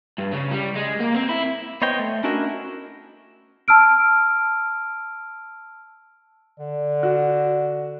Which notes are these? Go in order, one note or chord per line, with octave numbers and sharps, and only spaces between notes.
G2
C#3
G3
G#3
A#3
C4
E4
B3 C5 C#5 D#5 G5
A3
C#4 D4 E4 F#4 A#4 D#5
A5 E6 F6 D7
D3 D5
F#4